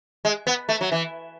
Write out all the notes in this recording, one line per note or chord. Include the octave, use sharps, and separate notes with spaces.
G#3
B3
A3
F#3
E3